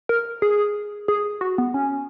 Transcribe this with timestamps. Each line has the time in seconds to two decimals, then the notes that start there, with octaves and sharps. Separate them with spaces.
0.09 A#4
0.42 G#4
1.08 G#4
1.41 F#4
1.58 B3
1.74 C#4